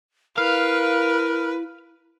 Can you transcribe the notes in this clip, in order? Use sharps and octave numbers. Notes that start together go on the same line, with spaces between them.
E4 A#4 B4 F5